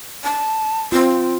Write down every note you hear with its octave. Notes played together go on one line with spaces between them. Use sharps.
A5
C4 F4